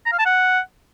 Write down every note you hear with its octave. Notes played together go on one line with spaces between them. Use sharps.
A#5
F5
A5
F#5